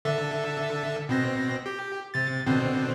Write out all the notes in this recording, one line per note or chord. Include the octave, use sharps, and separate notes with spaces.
D3 A4 E5
B2 C4 A#6
G4
C3 A6
B2 D3 C4